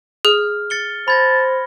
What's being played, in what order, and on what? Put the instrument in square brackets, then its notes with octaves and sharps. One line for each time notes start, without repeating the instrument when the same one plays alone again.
[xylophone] G#4 [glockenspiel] F6
[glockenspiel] A6 C#7 G7
[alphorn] C5 [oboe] A5 [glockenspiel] B5 G#6 A#6